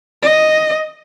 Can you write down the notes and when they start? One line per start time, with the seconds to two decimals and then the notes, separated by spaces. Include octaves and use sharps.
0.23 D#5